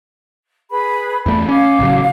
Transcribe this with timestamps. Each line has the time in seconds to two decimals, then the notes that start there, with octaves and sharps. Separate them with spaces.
0.71 G#4 B4 B5
1.26 E2 A3 D5 B5
1.49 C#4 F5 D6
1.79 A1 C#3 F#3